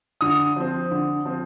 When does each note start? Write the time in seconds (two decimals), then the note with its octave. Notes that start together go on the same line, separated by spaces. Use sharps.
0.21 D3 D#6
0.56 F3 C4
0.91 D3
1.25 F3 C4